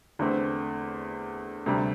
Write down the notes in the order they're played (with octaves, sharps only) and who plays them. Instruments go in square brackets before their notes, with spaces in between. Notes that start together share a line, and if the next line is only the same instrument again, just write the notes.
[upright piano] E2 D3 A3 C4
D2 C3 G3